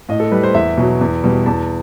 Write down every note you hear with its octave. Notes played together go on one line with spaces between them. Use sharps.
A2 D#5
A4
G3 B4
C5
E2 E5
B2 F#3
E2
B2 G3
E2 A5